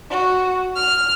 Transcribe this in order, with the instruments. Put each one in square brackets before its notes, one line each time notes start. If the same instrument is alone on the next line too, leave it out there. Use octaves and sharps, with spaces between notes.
[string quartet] F#4
F6